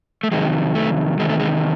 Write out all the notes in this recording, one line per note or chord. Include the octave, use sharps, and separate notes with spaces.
A3
F2 C3 D#3 F#3 G#3
A3
E2 C3 D#3 G#3
A3
G#3